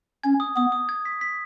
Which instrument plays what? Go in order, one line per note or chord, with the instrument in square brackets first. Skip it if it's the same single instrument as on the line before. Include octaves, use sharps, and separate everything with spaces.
[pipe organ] C#4 [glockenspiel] G#6
[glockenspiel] D#6
[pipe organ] B3 [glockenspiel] D#6
[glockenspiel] D#6
G#6
B6
B6